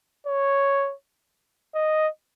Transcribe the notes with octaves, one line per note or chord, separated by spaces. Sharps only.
C#5
D#5